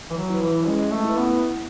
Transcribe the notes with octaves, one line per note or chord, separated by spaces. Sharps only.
E3
F#3
E4 B4
E3
G#3 C#4
A3
E4 B4
B3